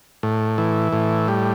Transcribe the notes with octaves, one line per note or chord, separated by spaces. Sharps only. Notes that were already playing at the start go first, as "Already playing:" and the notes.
A2
E3
A2
G3